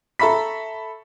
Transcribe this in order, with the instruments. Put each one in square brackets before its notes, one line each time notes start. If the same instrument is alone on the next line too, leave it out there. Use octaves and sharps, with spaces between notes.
[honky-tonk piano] A4 E5 B5 [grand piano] A#5 C#6 B6